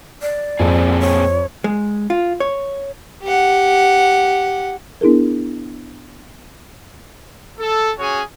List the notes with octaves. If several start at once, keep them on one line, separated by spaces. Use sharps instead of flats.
D5
F2 A#2 C4 G#4
C#5
G#3
F4
C#5
G4 F#5
B3 D4 E4 G#4 A#4
A4
C#4 F#4 G#4 C#5 G#5